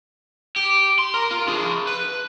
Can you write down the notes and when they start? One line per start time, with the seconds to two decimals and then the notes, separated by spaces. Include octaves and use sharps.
0.56 G4
0.99 C6
1.14 A#4
1.31 F4
1.48 D4 G#4
1.87 B4